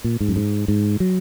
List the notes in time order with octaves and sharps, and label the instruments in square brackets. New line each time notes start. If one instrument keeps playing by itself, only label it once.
[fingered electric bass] A#2
G#2
F#2
G#2
G#2
F#3